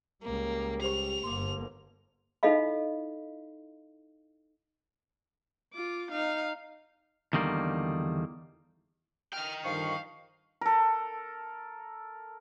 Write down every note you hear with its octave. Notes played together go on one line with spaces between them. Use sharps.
C#2 G3 A#3
G4 C5 C#6 F7
G1 A#3 C6 D6
D#4 E4 A4 D#5 F5 B5
F4 D6
D#4 F5
E2 D3 D#3 G3 A#3
D#5 G5 F6
G2 D3 D#3 F3 F5 C#6
A4 A#4